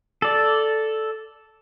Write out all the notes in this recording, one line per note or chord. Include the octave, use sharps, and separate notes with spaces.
A4 D5